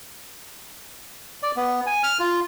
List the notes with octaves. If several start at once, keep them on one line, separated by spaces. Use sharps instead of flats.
D5
B3
G#5
F6
F4